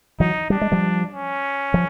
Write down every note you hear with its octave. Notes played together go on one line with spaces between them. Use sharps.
E3 F#3 D#4
G3 D4
G#3
F3 G3
C#4
F3